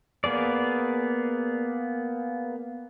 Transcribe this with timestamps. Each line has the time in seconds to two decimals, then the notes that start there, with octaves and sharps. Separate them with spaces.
0.24 A#3 B3 G#4 D5